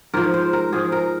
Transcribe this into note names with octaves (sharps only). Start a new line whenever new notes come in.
G#2 F3 A#4
C5
A#4
G#2 F3 G#4
A#4